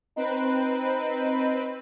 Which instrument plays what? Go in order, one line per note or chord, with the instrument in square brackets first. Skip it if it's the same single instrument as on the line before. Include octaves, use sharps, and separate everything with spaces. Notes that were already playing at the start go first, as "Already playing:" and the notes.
[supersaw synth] C4 B4 [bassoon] D#4